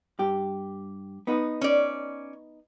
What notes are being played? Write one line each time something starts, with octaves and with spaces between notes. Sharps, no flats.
G2 G4
B3 D#4 B4
C#4 D5